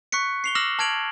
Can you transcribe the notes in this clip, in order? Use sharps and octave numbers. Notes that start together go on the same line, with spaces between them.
C#6 F#6 B6 C#7
C7 F7 G7
D6 E6 F6 A#6 E7 F#7
A5 F6 G#6 D7 F7 F#7